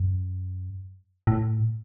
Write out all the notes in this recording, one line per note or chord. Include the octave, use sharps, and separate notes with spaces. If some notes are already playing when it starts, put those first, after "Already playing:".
Already playing: F#2
A2